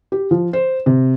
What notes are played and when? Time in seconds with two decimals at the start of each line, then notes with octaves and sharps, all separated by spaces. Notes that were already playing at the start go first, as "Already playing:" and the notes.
0.12 G4
0.31 F3
0.53 C5
0.86 C3